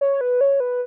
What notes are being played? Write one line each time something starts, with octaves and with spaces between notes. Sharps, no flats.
C#5
B4
C#5
B4